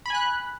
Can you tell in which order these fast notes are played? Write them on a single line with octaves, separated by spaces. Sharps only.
B5 G#5 F#6